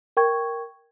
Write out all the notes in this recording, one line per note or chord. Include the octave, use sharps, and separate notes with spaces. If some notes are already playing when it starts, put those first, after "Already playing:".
A#4 G5 C#6 G#6